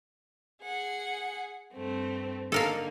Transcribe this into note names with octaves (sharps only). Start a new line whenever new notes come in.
G#4 F#5
G2 A3 C4
D3 A#3 D#4 A4 A#4 F5